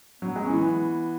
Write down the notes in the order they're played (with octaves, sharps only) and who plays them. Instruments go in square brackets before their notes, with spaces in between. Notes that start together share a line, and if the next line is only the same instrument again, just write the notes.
[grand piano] F#3 [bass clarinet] B3
[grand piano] G#3
[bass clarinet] C#4
[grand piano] E3
[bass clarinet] B3